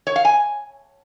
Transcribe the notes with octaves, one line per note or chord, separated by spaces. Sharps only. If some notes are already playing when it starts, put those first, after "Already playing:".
C#5
F5
G#5